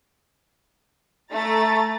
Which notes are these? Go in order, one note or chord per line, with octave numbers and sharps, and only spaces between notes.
A3 A#5 A6